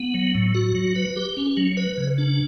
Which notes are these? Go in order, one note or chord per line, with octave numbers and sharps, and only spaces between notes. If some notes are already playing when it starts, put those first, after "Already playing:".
Already playing: B3
F#3
A2
F#4
F#3
B4
G4
C#4
F#3
B4
C#3
D4